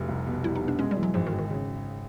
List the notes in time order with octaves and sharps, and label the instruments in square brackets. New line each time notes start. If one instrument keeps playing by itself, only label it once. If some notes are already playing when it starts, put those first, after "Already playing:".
Already playing: [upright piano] F1
C2
B2
[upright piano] G3 [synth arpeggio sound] E4
[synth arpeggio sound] D#4
[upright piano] B2
[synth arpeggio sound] D4
[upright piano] G#3 [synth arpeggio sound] C#4
[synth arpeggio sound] G3
[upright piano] E3
[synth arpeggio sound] F#3
[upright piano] G#1 [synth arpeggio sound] F3
[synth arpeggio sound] D#3
[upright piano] G#1
[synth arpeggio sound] D#3
[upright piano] C#3